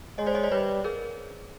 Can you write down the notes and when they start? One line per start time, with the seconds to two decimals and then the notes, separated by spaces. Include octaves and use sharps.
0.18 G#3 C#5 D#5
0.27 C5 D5
0.35 C#5 D#5
0.43 C5 D5
0.51 G3 B4 C#5
0.84 G#4 A#4